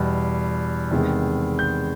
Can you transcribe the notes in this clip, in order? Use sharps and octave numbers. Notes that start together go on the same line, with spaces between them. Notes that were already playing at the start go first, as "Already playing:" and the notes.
Already playing: E2 B2 G3
E2 C3 D#3 G#3
G6